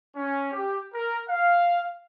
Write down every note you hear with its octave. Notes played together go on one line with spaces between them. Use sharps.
C#4
G4
A#4
F5